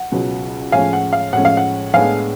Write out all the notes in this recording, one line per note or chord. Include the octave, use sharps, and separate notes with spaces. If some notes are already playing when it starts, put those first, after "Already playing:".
Already playing: F#5
C#2 B2 F#3 B3
A2 F3 G#3 C#4 F5 G#5
F#5
F5
A2 F3 G#3 C#4 F#5
F5
F#5
A2 G#3 B3 D4 F5 G#5